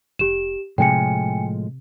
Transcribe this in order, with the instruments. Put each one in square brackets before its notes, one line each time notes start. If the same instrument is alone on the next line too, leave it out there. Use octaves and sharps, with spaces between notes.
[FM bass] F1 [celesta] G4 E7
[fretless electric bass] A2 F3 G#3 [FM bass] C3 [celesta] G5 G#5 C#7